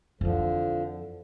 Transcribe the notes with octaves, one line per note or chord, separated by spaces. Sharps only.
F2 D3 E3 F3